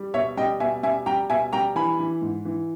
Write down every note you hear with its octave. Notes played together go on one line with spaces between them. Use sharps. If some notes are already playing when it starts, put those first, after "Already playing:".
Already playing: G3
B2 C#5 E5
G3 D#5 G5
B2 E5 G#5
G3 E5 G#5
G3 G5 A#5
B2 E5 G#5
G3 G5 A#5
E3 G#5 B5
E3
G#2
E3